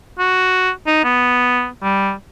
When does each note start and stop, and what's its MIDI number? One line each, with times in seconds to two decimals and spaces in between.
0.19 0.70 66
0.86 1.00 63
1.04 1.67 59
1.83 2.11 55